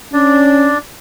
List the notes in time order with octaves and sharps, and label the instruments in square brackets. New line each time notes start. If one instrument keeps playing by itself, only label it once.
[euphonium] C#4 [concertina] D4 D5